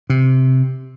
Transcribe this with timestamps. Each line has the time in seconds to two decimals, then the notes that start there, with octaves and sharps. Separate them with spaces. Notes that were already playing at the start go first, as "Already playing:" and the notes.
0.10 C3